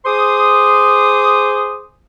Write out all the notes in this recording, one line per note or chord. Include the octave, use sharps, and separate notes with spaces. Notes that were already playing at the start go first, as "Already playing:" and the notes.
G#4 C5 C6 D6 D#6